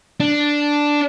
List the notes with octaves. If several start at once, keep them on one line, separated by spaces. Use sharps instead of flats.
D4